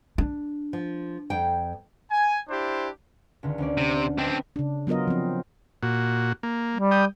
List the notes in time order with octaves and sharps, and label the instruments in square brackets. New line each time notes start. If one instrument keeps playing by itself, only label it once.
[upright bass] D4
[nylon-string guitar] F3
F2 G5
[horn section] G#5
D4 E4 G4 C5
[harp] C#2 D3 D#3
D2 C#4 D5
[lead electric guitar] C3
[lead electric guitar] C4 D4 [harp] B4 D#5 G5
[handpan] C#3 D4
F#3 B3 F4 A#4 D#5
F3 C4
[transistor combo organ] A#2 F#4
A#3
[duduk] G3
[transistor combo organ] G5 D#6